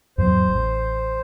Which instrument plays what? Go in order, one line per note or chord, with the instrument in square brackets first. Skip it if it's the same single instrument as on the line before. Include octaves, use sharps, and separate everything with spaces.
[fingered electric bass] E2 G#2 F#3 [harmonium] C5
[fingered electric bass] A1